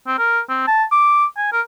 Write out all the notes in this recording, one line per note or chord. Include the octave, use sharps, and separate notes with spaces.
C4
A#4
C4
A5
D6
G#5
A#4